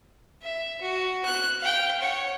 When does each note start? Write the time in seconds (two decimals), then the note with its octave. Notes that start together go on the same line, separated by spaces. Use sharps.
0.42 E5
0.81 F#4
1.25 F#6
1.59 F5 G5
2.00 C#5 F#5